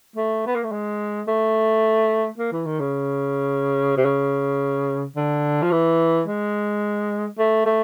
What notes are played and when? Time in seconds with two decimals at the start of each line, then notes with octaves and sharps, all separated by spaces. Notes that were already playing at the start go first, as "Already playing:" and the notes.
0.16 A3
0.47 B3
0.55 A#3
0.63 A3
0.72 G#3
1.28 A3
2.38 A#3
2.52 E3
2.66 D#3
2.80 C#3
3.97 C3
4.05 C#3
5.16 D3
5.62 F3
5.72 E3
6.27 G#3
7.38 A3
7.66 A3